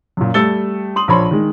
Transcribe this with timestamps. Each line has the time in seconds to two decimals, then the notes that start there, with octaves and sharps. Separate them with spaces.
0.17 F#2 A#2
0.34 G3 A3 E6 A6 C#7 G7
0.96 C6 D#6 F#7
1.08 A#1 F3 C#5 B5 C6
1.31 D#3 G#3